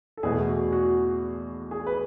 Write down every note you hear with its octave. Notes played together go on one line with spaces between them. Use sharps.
A4
E2 B2 A3 G#4
F#4
F#4
G#4
B4